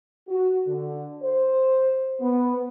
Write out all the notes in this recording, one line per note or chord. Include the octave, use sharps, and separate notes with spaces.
F#4
D3
C5
B3